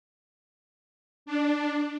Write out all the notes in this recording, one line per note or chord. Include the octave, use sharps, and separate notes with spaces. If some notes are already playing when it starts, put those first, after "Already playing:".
D4